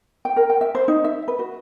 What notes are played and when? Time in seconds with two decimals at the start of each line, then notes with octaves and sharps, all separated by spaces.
0.25 G5
0.36 A#4
0.50 G5
0.61 E5
0.75 C5
0.88 D#4
1.04 E5
1.28 B4
1.39 F#4